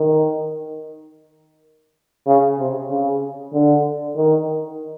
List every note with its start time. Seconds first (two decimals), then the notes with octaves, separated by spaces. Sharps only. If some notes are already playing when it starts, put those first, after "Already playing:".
Already playing: D#3
2.26 C#3
2.59 C3
2.90 C#3
3.53 D3
4.16 D#3